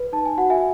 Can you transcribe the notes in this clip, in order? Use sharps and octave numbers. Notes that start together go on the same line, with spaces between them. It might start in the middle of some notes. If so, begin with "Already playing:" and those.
Already playing: B4
D#4 A5
G#5
F#4 F#5
E5 G#5